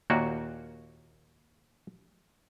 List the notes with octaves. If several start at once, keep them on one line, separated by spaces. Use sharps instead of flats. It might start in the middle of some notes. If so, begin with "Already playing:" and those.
D#2 A#2 A#3 F#4